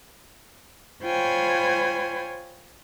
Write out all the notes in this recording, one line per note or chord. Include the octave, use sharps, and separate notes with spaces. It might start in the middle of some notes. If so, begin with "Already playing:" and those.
F4 C5 C#5 G5 G#5 B5